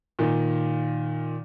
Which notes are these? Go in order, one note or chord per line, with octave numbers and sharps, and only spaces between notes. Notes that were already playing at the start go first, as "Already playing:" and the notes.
A#2 D#3